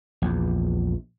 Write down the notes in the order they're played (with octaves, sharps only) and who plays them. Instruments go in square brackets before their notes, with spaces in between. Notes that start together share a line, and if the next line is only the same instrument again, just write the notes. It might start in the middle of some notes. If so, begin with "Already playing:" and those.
[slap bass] A#1 E2